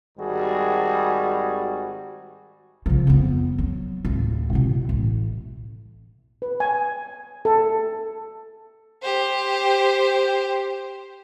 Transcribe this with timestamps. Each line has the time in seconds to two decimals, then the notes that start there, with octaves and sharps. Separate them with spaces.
0.18 G#1 G3 F#4 G#4
2.86 C#3 F3
3.07 F2 B3
3.58 F#3
4.05 D1
4.53 B2 E4
4.89 A1
6.42 B4
6.60 G#5
7.45 A4
9.02 G4 C5